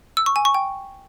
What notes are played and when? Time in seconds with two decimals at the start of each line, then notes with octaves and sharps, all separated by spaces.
0.17 E6
0.26 C#6
0.36 G#5
0.45 C#6
0.54 G5